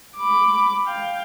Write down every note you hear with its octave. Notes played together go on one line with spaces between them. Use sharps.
B5 D6
F5 G5